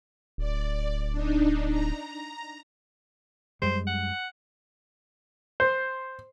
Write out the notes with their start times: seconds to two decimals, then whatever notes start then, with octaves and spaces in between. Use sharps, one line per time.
0.38 D1 D5
1.12 D4 D#4
1.68 A#5
3.62 F#2 G3 G#3 C5
3.87 F#5
5.60 C5